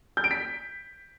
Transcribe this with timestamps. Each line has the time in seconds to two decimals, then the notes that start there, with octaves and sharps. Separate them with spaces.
0.17 G6
0.24 D7
0.31 B6